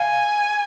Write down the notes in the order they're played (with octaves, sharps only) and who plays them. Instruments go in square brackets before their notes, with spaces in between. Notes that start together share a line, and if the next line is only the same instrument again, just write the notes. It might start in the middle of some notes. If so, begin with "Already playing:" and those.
Already playing: [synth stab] F5 [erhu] G#5